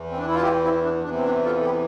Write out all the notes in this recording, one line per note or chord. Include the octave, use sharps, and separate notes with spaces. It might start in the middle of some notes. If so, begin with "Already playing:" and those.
Already playing: E2 E3
C4
D4
E4
F4
E4 G4
C4 E4
D4
E2 C3 E3 D4
C4
D4
F4 A4
A4
E4 G4